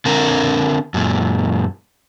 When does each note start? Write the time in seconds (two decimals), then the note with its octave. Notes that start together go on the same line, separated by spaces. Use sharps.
0.05 D3 C4 A#4
0.94 F#2 A#2